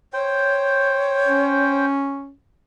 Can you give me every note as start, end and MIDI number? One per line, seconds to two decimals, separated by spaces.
0.13 1.86 72
0.13 1.78 73
0.13 1.86 79
1.27 2.32 61